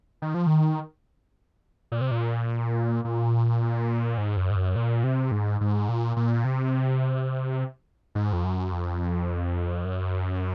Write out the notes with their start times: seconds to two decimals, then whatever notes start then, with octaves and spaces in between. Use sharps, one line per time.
0.22 D#3
0.34 F3
0.47 D#3
1.92 A#2
2.01 C3
2.11 A#2
3.05 A#2
4.18 G#2
4.37 F#2
4.50 G#2
4.56 F#2
4.76 A#2
5.04 C3
5.31 G#2
5.61 G#2
5.89 A#2
6.17 A#2
6.45 C3
8.15 G#2
8.33 F2
8.44 F#2
8.72 F2
9.85 F#2